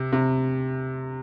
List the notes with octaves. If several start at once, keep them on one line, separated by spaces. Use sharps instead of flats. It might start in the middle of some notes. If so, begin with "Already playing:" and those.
Already playing: C3
C3